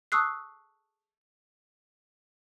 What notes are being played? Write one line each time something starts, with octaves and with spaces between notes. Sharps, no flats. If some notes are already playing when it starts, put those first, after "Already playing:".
A5 C#6 D#6 E6 F#6 C7